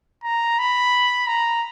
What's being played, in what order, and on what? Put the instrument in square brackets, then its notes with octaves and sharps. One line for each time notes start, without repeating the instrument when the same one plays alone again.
[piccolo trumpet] A#5
B5
A#5